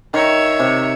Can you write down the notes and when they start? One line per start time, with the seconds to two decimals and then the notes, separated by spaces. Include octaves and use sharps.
0.14 D#3 C#5 E5
0.60 C3